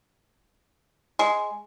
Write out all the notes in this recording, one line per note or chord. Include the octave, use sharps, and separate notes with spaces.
G#3